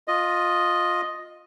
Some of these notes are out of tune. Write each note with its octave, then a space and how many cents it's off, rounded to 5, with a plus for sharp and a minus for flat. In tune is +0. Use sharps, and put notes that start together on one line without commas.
F4 +15 D#5 +0